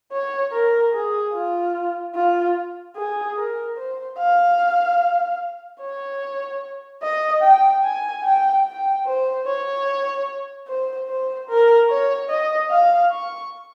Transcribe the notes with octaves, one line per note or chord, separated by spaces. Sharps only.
C#5
A#4
G#4
F4
F4
G#4
A#4
C5
F5
C#5
D#5
G5
G#5
G5
G5
C5
C#5
C5
C5
A#4
C#5
D#5
F5
C#6